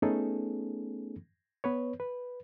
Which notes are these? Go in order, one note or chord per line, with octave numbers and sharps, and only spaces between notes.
A3 B3 C#4 D#4 G#4 A4
B3 B4 C#5
B4